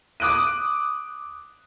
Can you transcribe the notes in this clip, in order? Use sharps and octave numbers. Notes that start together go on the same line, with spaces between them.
D6 D#6 F#6 D7 D#7